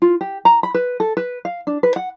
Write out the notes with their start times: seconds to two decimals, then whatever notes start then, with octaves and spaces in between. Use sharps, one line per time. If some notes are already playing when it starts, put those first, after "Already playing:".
0.02 F4
0.21 G4
0.45 A#5
0.63 B5
0.74 B4
1.00 A4
1.17 B4
1.45 F5
1.67 D4
1.83 B4
1.96 F#5